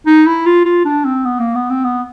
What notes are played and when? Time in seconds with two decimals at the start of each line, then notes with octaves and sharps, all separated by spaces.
0.06 D#4
0.27 E4
0.46 F4
0.65 F4
0.85 D4
1.05 C4
1.25 B3
1.40 A#3
1.56 B3
1.70 C4
1.84 B3